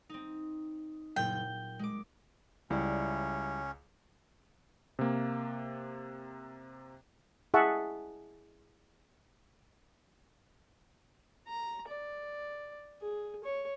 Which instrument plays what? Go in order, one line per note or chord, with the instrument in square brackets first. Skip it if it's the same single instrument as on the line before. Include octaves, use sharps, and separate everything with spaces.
[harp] C4 D#4
[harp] F#1 A#2 [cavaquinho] G5
[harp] G6
G#3 D6
[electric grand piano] C#2 [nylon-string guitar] G3 E4 [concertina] C#4
[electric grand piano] C3 A#3
[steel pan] E4 G#4 E5 F#5 A5 C#6
[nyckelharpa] A#5
D5
G#4
C#5